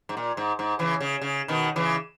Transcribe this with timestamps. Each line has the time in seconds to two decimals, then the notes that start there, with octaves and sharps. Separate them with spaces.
0.09 G#2
0.17 A#2
0.37 G#2
0.59 G#2
0.79 C#3 E3
1.00 C#3
1.21 C#3
1.48 B2 D#3
1.76 C#3 E3